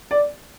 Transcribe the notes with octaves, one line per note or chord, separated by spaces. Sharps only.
D5